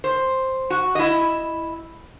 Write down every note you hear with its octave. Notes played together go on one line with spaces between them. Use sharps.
C5
F#4
E4 D#5